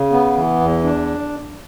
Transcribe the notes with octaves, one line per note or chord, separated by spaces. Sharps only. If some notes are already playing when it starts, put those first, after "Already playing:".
Already playing: C#3
B3
E3
E2
D4